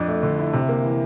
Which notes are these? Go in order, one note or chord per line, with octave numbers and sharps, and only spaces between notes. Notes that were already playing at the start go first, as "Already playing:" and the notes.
Already playing: F2 D4
A3
D3
E4
C3
A#3
E3